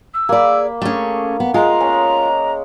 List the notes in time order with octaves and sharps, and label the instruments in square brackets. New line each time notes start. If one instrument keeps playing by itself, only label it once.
[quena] E6
[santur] A#3 B5 [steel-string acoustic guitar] G#4 D5
[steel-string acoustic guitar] A3 C#4 [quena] G#4
[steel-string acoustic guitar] B3
[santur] G#3 [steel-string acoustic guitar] F4 [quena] A#5
[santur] C#4